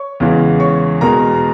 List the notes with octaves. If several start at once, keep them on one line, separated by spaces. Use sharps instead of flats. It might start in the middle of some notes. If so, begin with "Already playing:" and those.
Already playing: C#5 C#6
E2 C#3 E3 G#3
C#5 C#6
E2 B2 G#3 A#4 A#5